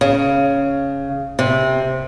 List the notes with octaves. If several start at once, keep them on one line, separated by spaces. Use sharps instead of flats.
C#3
C3